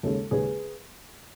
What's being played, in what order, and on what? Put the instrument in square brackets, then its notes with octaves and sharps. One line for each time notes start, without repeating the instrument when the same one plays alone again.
[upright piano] D#2 C#3 G#3 C#4 A4
D#2 C#3 G#3 C#4 G#4 B4